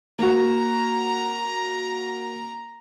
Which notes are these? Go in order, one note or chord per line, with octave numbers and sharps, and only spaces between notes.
A#3 F#4 A#5